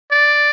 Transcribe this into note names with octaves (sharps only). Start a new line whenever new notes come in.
D5